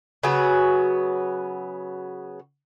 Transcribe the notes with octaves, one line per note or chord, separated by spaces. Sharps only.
C#3 F#3 B3 F#4